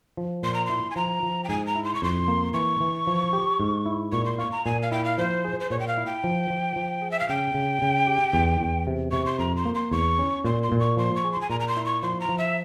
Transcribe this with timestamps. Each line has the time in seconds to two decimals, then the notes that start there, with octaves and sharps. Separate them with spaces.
0.17 F3
0.43 A#2 C6
0.54 A#5
0.66 E4 C6
0.91 G#5
0.96 F3 A#5
1.23 F3
1.44 G5
1.49 G#2 G#5
1.67 A#5
1.75 E4
1.84 C6
1.95 C#6
2.02 F2 C6
2.28 A#3
2.54 E3 C#6
2.80 E3
3.07 F3
3.33 G4
3.60 G#2
3.86 E4
4.12 A#2 C#6
4.25 C6
4.38 F4 C#6
4.52 A#5
4.65 A#2 G#5
4.82 F5
4.92 E4 G5
5.05 F5
5.18 F3 C5
5.45 G#4
5.60 C5
5.70 A#2 C#5
5.80 G5
5.88 F5
5.97 E4
6.06 G5
6.24 F3
6.50 F3
6.76 F3
7.02 G#4
7.11 E5
7.20 F5
7.29 C#3 G5
7.54 C#3
7.82 C#3
8.07 G4
8.33 E2
8.60 E2
8.87 C3
9.11 C3 C#6
9.26 C6
9.39 F2 A#5
9.56 C6
9.65 A#3
9.75 C6
9.92 E2 C#6
10.19 C#4
10.45 A#2 C6
10.63 C6
10.72 A#2
10.80 C#6
10.97 F3 C6
11.16 C#6
11.24 G#4
11.32 C6
11.41 G#5
11.50 A#2 A#5
11.60 A#5
11.68 C6
11.77 E4
11.86 C#6
12.02 F3 C6
12.20 A#5
12.29 F3
12.38 E5